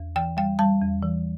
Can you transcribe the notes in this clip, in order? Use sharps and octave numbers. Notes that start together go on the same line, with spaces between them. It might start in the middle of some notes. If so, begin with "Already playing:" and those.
Already playing: E2
E3 G5
G3 G5
G3 A5
E2
E3